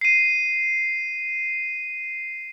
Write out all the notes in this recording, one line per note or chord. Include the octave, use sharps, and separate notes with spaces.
C7 D#7